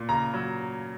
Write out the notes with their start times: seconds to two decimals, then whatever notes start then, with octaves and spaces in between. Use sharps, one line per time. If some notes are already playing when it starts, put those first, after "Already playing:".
Already playing: A#2
0.09 C#3 A#5
0.34 F#3